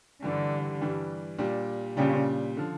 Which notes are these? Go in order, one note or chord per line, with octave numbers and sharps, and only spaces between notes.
G2 D3 E3 G3 D4
G2 E3 G3 D4
A#2 G3 D4 G4
A#2 C#3 G3 D4 G4
D3 F3